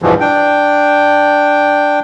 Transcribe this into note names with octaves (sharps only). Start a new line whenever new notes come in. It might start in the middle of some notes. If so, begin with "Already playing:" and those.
E2 G2 B2 E3 F3
D4 G5